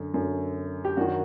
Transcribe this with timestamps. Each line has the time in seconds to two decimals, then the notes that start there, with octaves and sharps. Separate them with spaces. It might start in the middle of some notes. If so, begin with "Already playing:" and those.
Already playing: F#2 D3
0.13 F#2 D3
0.85 G4
0.97 F#2 D#3 D4 F#4